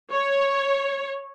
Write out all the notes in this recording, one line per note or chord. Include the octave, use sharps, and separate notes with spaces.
C#5